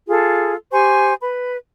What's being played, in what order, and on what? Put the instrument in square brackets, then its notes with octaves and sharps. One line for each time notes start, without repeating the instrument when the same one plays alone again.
[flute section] F4 G#4 A4
G4 C5 G#5 C#6
B4 B5